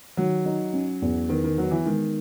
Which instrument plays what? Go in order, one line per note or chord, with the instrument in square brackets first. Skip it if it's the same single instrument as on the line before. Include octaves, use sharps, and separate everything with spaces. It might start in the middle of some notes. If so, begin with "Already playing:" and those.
[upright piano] D#3 [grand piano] F#3
[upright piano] D#4
C#4
E2
[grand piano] D#3 [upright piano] B3
[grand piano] D#3
[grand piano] F#3 [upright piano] B3
[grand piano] E3
[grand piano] D#3 [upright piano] G#3